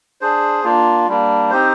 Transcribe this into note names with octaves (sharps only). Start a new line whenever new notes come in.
D4 G#4 C5
A#3 D4 F4
G3 A#3 D4
C4 D#4 G4 C5